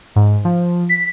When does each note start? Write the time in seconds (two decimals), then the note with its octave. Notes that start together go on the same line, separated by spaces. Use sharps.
0.16 G#2
0.45 F3
0.89 B6